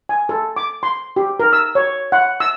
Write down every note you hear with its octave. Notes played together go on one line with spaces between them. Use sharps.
G#5
A4
D6
C6
G4
A#4
E6
C#5
F#5
E6